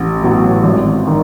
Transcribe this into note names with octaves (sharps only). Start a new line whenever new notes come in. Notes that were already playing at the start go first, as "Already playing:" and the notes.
Already playing: A1
A2 F#3 B3
G#1
D#3